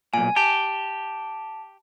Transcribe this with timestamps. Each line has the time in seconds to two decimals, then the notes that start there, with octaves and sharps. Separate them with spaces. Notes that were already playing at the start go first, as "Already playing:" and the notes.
0.14 B1 A#2 G#5
0.36 G4 A5